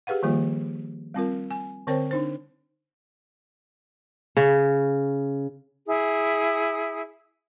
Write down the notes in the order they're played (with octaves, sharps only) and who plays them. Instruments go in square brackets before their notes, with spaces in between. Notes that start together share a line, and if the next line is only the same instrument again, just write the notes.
[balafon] G4 G#4 B4 F5 F#5
D#3 F3 G3 A#3 F4
G3 C4 F4 A#4
G#5
D3 C4 A#4 C5 C#5 G5
D4 D#4 C5
[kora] C#3
[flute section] E4 G#4